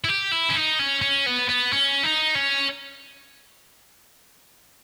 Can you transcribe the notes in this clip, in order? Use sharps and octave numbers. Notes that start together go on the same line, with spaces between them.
E4
G4
E4
C#4
D#4
C#4
C#4
B3
B3
C#4
D#4
C#4